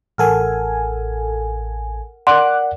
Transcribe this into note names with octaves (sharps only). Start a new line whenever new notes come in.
A1 A4 A#4 F#5 G#5 F6
A#4 D5 F#5 C6 D6 F#6